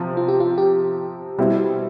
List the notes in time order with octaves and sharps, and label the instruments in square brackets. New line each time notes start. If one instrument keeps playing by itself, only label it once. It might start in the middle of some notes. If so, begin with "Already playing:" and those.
Already playing: [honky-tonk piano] C3 F3 C4
[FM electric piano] F4
G4
F4
G4
[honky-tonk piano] B2 G3 C4 E4